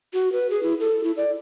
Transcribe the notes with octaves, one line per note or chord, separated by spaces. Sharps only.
F#4
B4
G#4
E4
A4
E4
D5